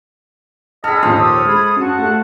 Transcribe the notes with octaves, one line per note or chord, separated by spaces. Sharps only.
G#4 A4 D#5 B5 F6
D#2 A#2 F3 C5 F5
G4 C#5 D#6 E6
G#3 B5 G#6
F#2 F#4 A5
A3 A4 F#5